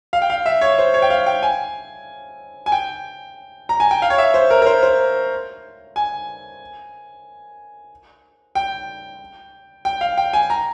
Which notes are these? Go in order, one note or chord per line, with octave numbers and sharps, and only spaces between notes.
F5
G5
F5
E5
C#5
C5
C#5
G5
F5
G5
G#5
G#5
G5
A#5
G#5
G5
F5
C#5
E5
C5
A#4
A#4
C5
C5
G#5
G5
G5
F5
G5
G#5
A#5